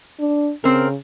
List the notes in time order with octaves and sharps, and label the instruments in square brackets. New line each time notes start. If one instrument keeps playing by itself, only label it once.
[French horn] D4
[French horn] C#3 [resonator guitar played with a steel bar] C4 A#4